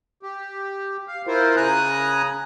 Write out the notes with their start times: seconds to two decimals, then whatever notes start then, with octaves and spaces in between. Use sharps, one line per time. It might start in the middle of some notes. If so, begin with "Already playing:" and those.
0.23 G4
1.08 F5
1.27 E4 F4 A#4 C5
1.56 C#3 G#5 A#5 D#6 F#6